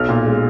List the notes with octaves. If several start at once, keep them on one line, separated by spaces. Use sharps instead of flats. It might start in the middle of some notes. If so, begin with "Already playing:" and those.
Already playing: B1 F6
A#2
G#3